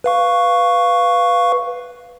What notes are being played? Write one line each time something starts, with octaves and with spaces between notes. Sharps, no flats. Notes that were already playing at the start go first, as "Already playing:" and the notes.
B4 F5 C#6